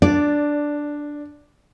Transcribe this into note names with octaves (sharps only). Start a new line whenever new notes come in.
D4 D5